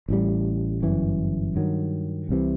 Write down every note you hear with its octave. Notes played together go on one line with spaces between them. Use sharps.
A1 A2 G3
G1 F#2 E3
G2 D#3 F#3
C2 C3 E3